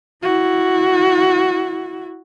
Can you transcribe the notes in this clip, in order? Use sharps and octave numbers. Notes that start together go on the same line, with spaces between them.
E4 F#4